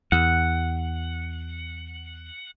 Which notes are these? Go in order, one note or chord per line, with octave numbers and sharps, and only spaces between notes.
E2 F#5